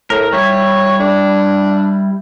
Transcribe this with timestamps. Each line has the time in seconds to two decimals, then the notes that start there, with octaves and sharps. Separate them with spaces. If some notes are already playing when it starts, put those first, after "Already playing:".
0.10 A2 A#4
0.33 G3 E4 C#5
1.00 D4